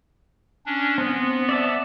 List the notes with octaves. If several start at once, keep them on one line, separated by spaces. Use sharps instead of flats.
C#4 D4
B3 C4
D5 E5 A5